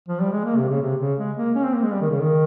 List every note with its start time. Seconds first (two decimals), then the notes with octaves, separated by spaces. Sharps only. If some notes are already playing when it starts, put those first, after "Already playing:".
0.09 F3
0.20 G3
0.32 G#3
0.45 A#3
0.57 C3
0.69 C#3
0.82 C3
1.00 C#3
1.19 G#3
1.37 A#3
1.56 C#4
1.65 C4
1.74 A#3
1.83 G#3
1.92 G3
2.02 D#3
2.11 C#3
2.20 D#3